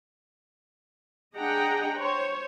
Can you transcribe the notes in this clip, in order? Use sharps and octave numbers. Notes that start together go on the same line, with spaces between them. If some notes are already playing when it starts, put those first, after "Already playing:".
D4 G#4 D#5 F#5 G5 A#5
C5 C#5